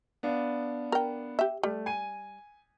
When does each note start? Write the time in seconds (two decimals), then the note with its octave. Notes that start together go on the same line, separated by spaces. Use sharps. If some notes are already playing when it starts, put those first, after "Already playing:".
0.23 B3 D4 F5
0.92 A#4 G5
1.39 G4 E5
1.63 G3 A3
1.86 G#5 D#7